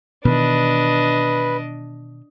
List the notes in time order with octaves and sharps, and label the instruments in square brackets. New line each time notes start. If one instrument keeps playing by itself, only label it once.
[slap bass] B2 D#3 E3 [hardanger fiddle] D4 D#5 [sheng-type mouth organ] B4